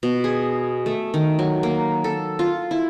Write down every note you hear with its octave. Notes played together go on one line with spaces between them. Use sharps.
B2
G#4
A3
D#3
F#3
A#3
A4
F4
E4